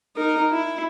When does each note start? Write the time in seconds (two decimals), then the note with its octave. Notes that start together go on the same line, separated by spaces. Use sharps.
0.16 D#4 A#4
0.51 E4